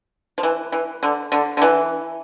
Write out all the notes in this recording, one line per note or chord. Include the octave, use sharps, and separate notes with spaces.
F3
E3
E3
D3
D3
D3
E3